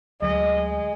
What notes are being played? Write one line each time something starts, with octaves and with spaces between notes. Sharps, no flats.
D2 F#3 G#3 D#5